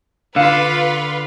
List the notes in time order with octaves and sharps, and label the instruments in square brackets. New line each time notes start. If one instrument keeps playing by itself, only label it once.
[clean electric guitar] D3 [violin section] F4 B4 [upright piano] F5